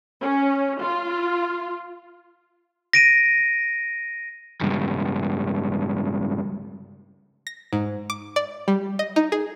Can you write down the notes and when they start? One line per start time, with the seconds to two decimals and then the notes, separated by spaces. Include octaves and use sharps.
0.21 C#4
0.82 F4
2.93 A#6 D7 D#7
4.61 C#2 G2
7.47 A#6
7.73 G#2
8.10 D6
8.36 D5
8.68 G3
8.99 D#5
9.16 D#4
9.32 G#4